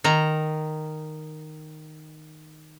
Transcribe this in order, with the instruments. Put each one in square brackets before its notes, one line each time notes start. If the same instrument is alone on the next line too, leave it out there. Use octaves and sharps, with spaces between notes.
[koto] D#3 A#5